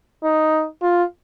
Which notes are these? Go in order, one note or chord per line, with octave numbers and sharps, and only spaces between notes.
D#4
F4